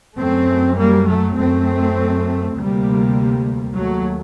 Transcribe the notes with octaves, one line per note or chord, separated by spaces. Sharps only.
F#2 A3 C4
G3 A#3
F#3 A3
F#2 A3 C4
D2 C3 G3 A#3
D#2 F#3 A3